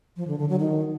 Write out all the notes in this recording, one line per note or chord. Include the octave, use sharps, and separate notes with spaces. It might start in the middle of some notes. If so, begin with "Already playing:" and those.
F3
D3
D3
F#3
D#3